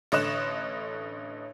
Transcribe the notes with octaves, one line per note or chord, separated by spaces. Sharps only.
A1 D3 C#5 D#5 F#6 E7